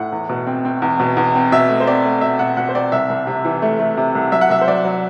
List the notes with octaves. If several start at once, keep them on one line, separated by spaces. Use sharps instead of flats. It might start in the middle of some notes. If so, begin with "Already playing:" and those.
Already playing: A2 F#5
E2
B2
C4
C4
E2
B2
E2
C4
B2 E5
A3
C5
C4 D5
A3
B2 E5
B2 F#5
B2 F#5
C5
C4 D5
C2 E5
C2
C3
E3
A3
A3
C3
C2
F#3 E5
F#5
C2 E5
C5
F#3 D5
F#3